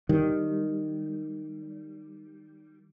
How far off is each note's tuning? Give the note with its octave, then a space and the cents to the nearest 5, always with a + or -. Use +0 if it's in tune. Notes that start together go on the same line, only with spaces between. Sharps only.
D#3 -10 G3 -10